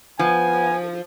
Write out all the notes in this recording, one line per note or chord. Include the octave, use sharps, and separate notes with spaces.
F3 B3 G#5